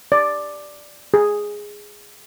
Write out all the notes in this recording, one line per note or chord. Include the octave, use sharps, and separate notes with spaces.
D5
G#4